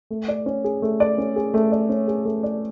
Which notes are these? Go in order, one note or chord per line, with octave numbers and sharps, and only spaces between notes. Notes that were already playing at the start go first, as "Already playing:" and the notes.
A3
D5
C#4
G#4
A3
D5
C#4
G#4
A3
D5
C#4
G#4
A3
D5